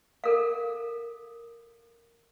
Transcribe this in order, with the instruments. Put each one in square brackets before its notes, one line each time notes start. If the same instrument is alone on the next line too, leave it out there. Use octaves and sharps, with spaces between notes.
[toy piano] A4 A#4 F5